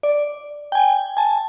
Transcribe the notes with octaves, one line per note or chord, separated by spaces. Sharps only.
D5
G5 G#5
G#5 A5